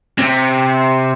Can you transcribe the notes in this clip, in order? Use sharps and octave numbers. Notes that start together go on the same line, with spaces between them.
C3